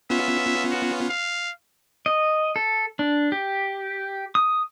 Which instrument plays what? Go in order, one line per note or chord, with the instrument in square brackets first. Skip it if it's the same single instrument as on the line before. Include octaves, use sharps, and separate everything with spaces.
[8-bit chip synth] B3 C#4 F4 [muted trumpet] E5
[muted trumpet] F#4
F5
[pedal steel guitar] D#5
A4
D4
G4
D#6